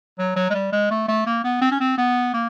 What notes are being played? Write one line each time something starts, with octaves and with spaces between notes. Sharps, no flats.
F#3
F#3
G#3
G3
G#3
A3
A3
A#3
B3
C4
C#4
C4
B3
A#3